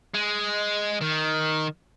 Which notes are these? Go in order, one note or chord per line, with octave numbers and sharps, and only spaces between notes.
G#3
D#3